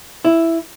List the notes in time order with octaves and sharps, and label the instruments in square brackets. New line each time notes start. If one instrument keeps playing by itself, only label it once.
[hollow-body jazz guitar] E4